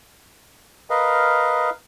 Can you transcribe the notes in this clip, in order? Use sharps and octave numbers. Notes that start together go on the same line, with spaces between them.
A#4 B4 D#5 F5